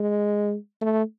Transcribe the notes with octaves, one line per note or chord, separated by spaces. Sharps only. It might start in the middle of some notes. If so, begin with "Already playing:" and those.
Already playing: G#3
A3